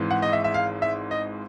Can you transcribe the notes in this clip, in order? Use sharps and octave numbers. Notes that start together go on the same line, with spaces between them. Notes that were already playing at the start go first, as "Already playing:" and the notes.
Already playing: G#1 G#2 E3
F#5
D#5
E5
E5
F5
E5
D#5